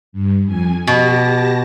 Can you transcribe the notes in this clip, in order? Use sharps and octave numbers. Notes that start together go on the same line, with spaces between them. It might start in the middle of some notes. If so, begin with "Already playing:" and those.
G2
F2 G#5
B2 G4 A5 A#6